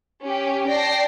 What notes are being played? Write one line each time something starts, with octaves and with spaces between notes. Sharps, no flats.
C#4 G4
D5 G5 A5 A#6 C7